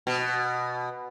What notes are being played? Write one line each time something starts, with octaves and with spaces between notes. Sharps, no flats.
B2